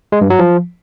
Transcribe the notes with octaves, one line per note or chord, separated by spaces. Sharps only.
G#3
G2
F#3
F3